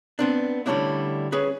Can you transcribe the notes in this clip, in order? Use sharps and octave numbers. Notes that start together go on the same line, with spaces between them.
B3 C4 D4
D3 G3 A3 C#4 D4 E4
C#4 G#4 B4